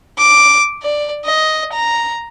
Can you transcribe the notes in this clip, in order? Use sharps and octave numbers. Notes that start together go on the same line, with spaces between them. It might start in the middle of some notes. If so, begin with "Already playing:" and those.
D6
D5
D#5
A#5